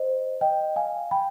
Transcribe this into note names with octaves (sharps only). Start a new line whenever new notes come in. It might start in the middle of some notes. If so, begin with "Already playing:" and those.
Already playing: C5 D#5
D#5 G5
F5 G#5
G5 B5